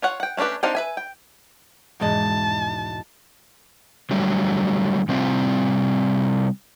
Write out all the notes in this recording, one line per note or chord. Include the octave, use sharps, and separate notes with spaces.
F4 C#5 F#5
F#5 G5
A3 C#4 D4 G4 B4
C4 D4 D#4 C5 F5
B4 E5 G#5
G5
E1 G#2 G#3 D#5 A5
D3 F#3 G3 A3
C3 G3 C4 E4 F4